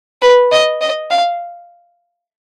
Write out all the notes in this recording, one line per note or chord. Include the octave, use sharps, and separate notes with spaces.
B4
D#5
D#5
F5